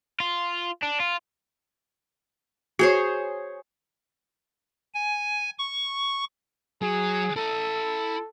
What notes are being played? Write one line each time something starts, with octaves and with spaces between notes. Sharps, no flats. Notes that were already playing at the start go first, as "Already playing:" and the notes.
F4
D4
F4
F#4 G#4 C5 C#5
G#5
C#6
F#3 G#4
E4 A4 A#5